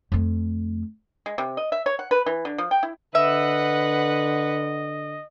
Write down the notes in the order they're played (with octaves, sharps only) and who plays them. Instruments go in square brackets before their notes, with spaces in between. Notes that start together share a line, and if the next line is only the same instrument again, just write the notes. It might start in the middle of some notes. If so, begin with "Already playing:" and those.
[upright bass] F2 A3
[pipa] G#3
C3
D#5
E5
C#5
F#5
B4
E3
D3
F3
G5
E4
[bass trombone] D3 [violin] B4 F#5 [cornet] D#5 [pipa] E5